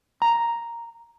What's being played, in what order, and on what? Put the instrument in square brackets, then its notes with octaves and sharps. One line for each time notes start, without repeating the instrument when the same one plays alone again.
[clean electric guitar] A#5